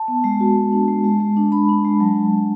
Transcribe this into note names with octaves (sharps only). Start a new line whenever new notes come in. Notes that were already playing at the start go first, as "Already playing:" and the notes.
Already playing: A5
B3
G#3
F#4
G#3
D4
G#3
G#3
G#3
D4
D4 B5
D4
G#3
F#3 A5